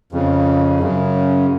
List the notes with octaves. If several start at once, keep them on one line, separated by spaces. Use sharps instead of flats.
F2 C#3
F#2 C#3